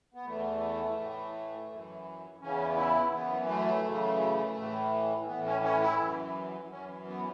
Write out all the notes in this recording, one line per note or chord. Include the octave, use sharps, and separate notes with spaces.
B3
E2 E3 A3
A2 E3
F#2 E3
E2 C#3 E3 C#4
E4
F#2 E3 B3
A3
F#2 C#3 E3
A2 E3
A2 E3 B3
C#4
C#4
E4
F#2 E3
F#2 E3 C#4
B3